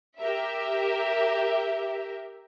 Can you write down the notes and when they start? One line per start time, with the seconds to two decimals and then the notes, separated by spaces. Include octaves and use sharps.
0.18 G4 A#4 E5